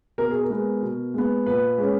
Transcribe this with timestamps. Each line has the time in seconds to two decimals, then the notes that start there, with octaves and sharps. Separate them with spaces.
0.18 B2 A#4
0.31 G#4
0.43 A#4
0.50 G#3 B3
0.82 B2
1.14 G#3 B3
1.46 A#2 B4
1.78 G#3 C#4